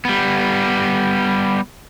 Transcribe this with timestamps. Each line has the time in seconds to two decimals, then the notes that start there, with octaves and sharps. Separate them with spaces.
0.05 G3 B3